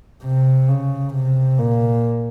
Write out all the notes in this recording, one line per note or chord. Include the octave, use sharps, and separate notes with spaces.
C3
C#3
C3
A#2